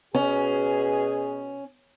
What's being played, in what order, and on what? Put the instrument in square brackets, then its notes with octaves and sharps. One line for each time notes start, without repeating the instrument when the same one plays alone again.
[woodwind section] B2 [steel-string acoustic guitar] C#4 [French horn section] G#4